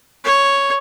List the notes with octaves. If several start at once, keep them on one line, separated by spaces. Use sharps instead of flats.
C#5